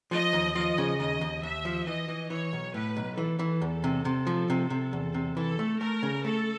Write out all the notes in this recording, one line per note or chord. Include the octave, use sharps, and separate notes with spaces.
F3 D#5
D#2
F3 D#5
C#3
D#2 D#5
D#2
D#2 E5
F3
E3 D#5
E3
E3 C#5
B1
A2 B4
B1
E3 A4
E3
E2
C3
C3
F3
C3
C3
E2
C3
E3 A4
A3
A3 A#4
C#3
A3 A4